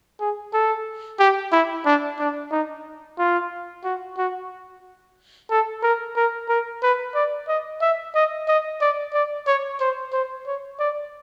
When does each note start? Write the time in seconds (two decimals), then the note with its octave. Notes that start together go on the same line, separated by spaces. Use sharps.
0.20 G#4
0.54 A4
1.19 G4
1.52 E4
1.86 D4
2.19 D4
2.52 D#4
3.18 F4
3.84 F#4
4.18 F#4
5.51 A4
5.83 A#4
6.16 A#4
6.49 A#4
6.83 B4
7.15 D5
7.48 D#5
7.82 E5
8.15 D#5
8.48 D#5
8.81 D5
9.14 D5
9.47 C#5
9.80 C5
10.13 C5
10.47 C#5
10.80 D5